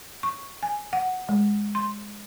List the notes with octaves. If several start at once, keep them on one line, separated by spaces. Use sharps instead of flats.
C#6
G#5
F#5
G#3
C6